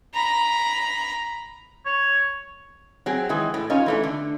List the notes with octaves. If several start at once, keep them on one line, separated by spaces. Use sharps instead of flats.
A#5 B5
C#5
F#3 C4 G#4
D#3 E3 G#3
A2
C#4 D#4 F4 C#5
E3 A3 D4
D3